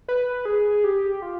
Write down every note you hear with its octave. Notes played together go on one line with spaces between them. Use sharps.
B4
G#4
G4
F4